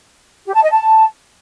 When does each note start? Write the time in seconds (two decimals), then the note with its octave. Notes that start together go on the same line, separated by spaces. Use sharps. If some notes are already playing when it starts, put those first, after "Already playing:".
0.46 G4
0.55 A5
0.63 D#5
0.71 A5